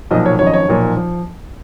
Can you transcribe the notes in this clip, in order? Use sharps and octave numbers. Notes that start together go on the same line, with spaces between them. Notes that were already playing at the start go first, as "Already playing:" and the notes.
B1 A#2 F3 D#5
C#5
G#1 F#2 F3 C#5
D#5
C#5
B1 A#2 F3
F3